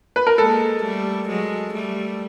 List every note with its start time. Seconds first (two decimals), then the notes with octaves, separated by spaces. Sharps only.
0.16 B4
0.27 A#4
0.38 G#3 A#3 A4
0.82 G3 A3
1.28 F#3 G#3
1.73 G3 A3